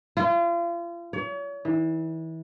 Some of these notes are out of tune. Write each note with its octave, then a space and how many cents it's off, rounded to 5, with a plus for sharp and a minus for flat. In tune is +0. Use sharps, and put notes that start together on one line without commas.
F4 -35
C#5 +40
E3 -30